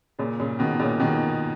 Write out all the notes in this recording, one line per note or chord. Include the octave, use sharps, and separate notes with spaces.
A#2 C#3
A#2 C#3
B2 D#3
A#2 C#3
B2 D#3